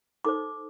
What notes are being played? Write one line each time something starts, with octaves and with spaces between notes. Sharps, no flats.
D#4 A4 C5 D6